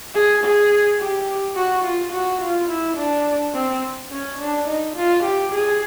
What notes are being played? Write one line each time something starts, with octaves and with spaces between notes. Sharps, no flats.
G#4
G#4
G4
F#4
F4
F#4
F4
E4
D4
C4
C#4
D4
D#4
F4
G4
G#4